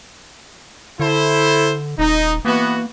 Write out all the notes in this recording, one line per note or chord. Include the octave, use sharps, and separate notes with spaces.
D3 E4 A4 C5
D#1 D#4
E3 A#3 B3 F#4